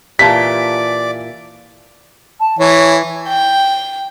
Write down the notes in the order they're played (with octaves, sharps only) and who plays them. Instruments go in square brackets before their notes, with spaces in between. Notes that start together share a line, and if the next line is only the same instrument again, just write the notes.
[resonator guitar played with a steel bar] A#2 E3 F4 [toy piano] G4 A5 [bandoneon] D5 D6 [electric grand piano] B6
[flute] A5
[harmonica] E3 [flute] C#5
[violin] G5